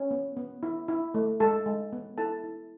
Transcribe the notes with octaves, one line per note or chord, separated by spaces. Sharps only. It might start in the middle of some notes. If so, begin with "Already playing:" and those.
Already playing: C#4 C#5
B3
B3
E4
E4
A3
G#3 A4 A5
G#3
B3
E4 A4 A5
E4